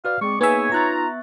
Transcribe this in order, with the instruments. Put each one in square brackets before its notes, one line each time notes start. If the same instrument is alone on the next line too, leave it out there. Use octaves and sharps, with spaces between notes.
[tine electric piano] F#4 B4 D5 [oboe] F5
[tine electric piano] G#3 [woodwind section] C4 G#4 D5 [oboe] C#6
[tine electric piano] A#3 D#4 G#4 [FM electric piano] B3 E5 [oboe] C#5 [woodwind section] G#5
[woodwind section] D#4 F4 A#5 [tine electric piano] C#6 F#6 A6